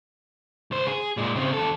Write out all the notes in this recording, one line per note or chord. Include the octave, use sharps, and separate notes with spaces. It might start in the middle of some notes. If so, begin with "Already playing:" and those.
C#2 C5
G#4
A#2 G#3
C#3 C4
D#2 A4